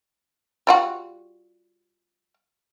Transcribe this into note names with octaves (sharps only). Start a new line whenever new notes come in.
G3 F4 F#4